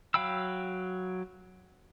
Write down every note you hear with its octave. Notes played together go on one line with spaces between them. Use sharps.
F#3 F5 G5 B5 E6